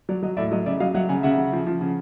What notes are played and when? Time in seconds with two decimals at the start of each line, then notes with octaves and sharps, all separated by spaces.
0.09 F#3 D5
0.23 F#3 D#5
0.37 A2 D5 E5
0.51 F#3 D#5
0.66 C#3 D5 E5
0.80 F#3 D#5 F5
0.95 F#3 E5 F#5
1.09 C#3 F#5 G#5
1.23 C#3 E5 F#5
1.38 C#3
1.53 F3
1.66 F3
1.81 C#3